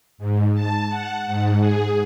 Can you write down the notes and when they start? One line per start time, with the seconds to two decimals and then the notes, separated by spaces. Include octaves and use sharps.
0.18 G#2
0.54 A5
0.89 F#5
1.27 G#2
1.60 G#4